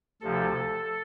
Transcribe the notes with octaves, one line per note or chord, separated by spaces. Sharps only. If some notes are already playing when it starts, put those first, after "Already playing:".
D2 C3 F3 A4